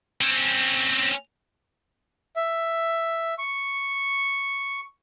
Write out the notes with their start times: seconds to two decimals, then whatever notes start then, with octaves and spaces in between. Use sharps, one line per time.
0.21 C4 C#4
2.36 E5
3.38 C#6